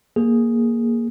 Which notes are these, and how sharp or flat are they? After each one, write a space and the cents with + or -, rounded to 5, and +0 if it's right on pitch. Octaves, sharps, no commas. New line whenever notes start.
A#3 +0 G#4 +0